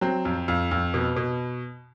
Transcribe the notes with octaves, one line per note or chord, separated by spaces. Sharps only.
F#3 C4
F2
F2
F2
B2
B2